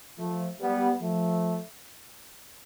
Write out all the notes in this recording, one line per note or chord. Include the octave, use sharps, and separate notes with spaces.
F3 A3
G3 B3
F3 A3